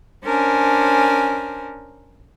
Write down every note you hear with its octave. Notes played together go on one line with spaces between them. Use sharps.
C#4 D4 A#4 C5 G#5